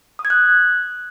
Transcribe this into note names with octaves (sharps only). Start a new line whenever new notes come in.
D#6
G#6
F#6